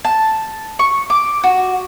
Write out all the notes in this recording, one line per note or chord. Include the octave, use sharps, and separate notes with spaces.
A5
C#6
D6
F#4